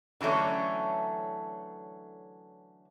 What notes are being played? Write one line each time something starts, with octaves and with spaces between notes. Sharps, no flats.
D3 E3 F#3 A3 C#4